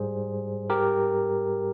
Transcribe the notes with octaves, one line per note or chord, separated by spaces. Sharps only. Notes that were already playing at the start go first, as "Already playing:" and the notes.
Already playing: G#2 G3 G#4 C5
G4 A#4